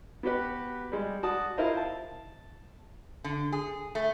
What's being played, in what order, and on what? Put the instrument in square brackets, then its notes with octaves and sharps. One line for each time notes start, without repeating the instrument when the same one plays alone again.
[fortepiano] B3 F#4 G4 B4
G3 G#3
F#4 D5 A5 D#6
E4 F4 A#4 C5 D#5 F5
A5
[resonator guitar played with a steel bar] D3
G#4
A3